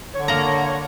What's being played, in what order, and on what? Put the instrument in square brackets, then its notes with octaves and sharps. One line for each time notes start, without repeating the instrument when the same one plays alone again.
[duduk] D3 [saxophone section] C#5
[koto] A#3 A#5